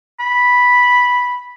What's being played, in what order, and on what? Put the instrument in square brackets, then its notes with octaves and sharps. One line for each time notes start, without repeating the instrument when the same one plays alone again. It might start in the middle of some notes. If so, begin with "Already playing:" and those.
[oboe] B5